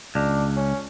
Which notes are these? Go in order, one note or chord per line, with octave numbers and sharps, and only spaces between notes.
C#2 D4
C#4